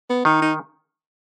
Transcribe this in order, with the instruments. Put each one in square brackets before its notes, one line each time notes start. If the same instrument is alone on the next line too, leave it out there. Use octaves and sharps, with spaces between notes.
[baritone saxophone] B3
[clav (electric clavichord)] D#3 [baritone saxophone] D#4
[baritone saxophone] D#4